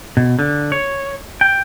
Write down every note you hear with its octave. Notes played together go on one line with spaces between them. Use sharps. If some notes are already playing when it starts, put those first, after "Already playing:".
B2
D3
C#5
G5